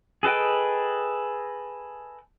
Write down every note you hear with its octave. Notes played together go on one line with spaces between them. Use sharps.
G#4 A4 B4 D#5 G5